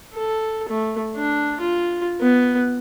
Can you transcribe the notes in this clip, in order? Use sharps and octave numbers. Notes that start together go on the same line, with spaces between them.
A4
A3
D4
F4
B3